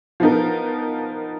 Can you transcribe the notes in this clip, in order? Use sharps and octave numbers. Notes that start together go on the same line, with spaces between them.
F3 B3 D#4 A#4